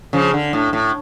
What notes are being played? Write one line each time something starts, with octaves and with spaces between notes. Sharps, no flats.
C#3 F3
D3
A2
A2